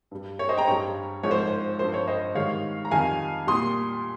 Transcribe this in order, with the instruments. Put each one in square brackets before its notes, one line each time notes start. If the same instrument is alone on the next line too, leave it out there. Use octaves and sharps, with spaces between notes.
[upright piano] G2 G3
C#5
C5 D#5
G5 A#5
G2 G3 C#5
G#2 F3 C#5
C5
C5
G2 F3 C5
C#5
C5 D#5
G#2 D#3 G3 C#5 F5
A#5
F2 D#3 G3 F5 G#5
A#2 G3 C6 D#6